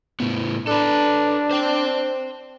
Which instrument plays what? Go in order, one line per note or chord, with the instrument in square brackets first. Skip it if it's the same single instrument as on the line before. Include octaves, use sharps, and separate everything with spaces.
[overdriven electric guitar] A2 B3
[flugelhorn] D4 [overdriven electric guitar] A4 B4
[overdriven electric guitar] C5 G5